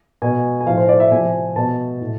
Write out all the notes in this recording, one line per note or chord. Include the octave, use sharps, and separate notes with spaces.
B2 G#5
G#5
A2 F3 F5
C5
D5
E5
C3 F3 G#5
B2 A5
A2